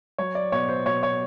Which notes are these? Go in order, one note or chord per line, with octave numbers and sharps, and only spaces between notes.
F#3 C#5
D5
B2 C#5
C5
B2 C#5
C#5